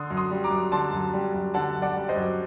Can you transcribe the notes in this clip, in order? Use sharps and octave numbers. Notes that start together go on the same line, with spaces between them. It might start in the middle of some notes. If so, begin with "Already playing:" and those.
Already playing: D3 C6 D#6
F#2
C6 D#6
G3
A#5 D6
F#2
D3 A5 C6
F#2
G3
F#2
D3 F#5 A5
F#2
D5 F#5
G3
C5 D#5
F#2